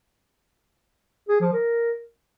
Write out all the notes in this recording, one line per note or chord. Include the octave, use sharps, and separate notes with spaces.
G#4
F3
A#4